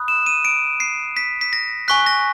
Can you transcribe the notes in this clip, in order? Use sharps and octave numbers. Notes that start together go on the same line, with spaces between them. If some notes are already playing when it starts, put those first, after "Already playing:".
Already playing: B5 D#6 F#6
E7
D#7
D7
C7
B6
B6
A#6
G#5 C#6 F#6 B6
A#6